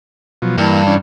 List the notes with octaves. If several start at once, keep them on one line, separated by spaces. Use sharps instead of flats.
B2 F3 F#3
G2 E3 A#3
E3 C#4 D4